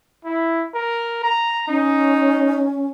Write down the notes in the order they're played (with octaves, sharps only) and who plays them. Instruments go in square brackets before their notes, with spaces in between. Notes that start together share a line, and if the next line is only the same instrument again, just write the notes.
[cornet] E4
A#4
A#5
[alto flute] C#4 [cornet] D#4